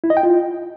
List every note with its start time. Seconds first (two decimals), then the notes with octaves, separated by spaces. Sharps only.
0.04 E4
0.10 D#5
0.17 G5
0.23 F4